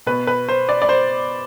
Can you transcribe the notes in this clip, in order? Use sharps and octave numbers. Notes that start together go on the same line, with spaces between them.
B2 B4
B4
C5
D5
D5
C5